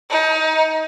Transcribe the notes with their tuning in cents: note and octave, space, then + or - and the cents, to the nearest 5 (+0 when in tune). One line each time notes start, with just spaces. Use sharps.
D#4 +30